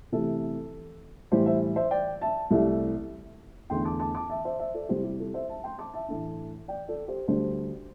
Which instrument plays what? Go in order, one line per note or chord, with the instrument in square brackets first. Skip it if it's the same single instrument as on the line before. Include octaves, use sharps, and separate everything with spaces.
[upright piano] C3 E3 A3 A4
A2 E3 G3 G4 C5
C5 E5
C5 E5
D5 G5
E5 A5
C2 C3 A3 E4
E2 D3 A3 D4 G5 C6
A5 D6
A5 D6
A5 D6
E5 A5
C5 E5
C5 E5
A4 D5
C3 G3 E4 G4 C5
G4
A4
C5 E5
E5 A5
G5 C6
A5 D6
E5 A5
A2 E3 A3 D4
D5 G5
A4 D5
G4 C5
D2 D3 G3 D4 G4 C5